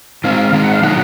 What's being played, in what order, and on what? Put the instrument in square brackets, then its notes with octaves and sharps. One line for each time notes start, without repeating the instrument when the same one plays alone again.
[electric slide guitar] D#3 G#3 C4 [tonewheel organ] F5
[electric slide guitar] D#3 G#3 C4
[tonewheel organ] F#5
F5
[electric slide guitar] B2 F#3 A#3 D#4 [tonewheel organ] F#5